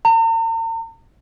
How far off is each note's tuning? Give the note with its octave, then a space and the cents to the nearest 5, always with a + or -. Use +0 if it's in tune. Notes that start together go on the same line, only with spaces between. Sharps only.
A#5 -45